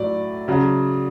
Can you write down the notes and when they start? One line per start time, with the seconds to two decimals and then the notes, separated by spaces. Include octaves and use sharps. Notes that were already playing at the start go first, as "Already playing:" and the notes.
Already playing: A2 F#3 D5
0.48 C#3 F#3